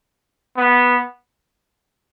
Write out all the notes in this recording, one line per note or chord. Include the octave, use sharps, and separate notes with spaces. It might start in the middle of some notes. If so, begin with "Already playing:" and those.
B3